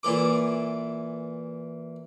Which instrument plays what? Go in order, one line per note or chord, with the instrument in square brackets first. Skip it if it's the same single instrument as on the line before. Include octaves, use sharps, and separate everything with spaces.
[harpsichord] A#2 E3 A4 D6